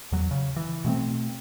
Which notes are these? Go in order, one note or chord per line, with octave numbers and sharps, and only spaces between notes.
E2 F#3
C#3
E3
B2 A3 B3 C4